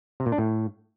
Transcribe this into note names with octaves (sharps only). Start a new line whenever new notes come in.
C3
A#2
D4
A2